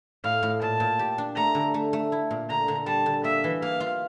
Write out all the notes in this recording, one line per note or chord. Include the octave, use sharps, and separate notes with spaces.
A2 F5
A2
A#2 A5
A#2
G4
D4
A3 A#5
D3
A3
A3
E4
A#2
D3 A#5
D3
G3 A5
D3
A#3 E5
E3
A#3 F5
F4